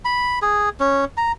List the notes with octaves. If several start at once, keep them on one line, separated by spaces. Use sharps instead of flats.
B5
G#4
C#4
A#5